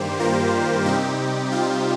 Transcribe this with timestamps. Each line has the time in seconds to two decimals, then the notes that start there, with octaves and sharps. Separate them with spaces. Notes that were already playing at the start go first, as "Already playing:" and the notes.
Already playing: G2 D#3 G3 A#3 G4 C5
0.19 F4 A#4
0.85 C3 G3 C4 D#4 G4
1.52 C4 F4